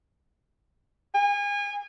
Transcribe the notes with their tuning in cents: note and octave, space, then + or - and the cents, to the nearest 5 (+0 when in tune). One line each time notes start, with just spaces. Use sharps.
G#5 -30